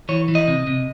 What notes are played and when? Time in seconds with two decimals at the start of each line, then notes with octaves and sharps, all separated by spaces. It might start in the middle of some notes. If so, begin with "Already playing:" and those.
0.09 E3 C#5
0.28 E3
0.35 D#5
0.48 C3
0.67 C3